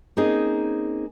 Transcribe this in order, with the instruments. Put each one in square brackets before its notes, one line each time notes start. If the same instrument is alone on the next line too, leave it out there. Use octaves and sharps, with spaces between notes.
[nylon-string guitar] A#3 C4 C#4 D#4 G#4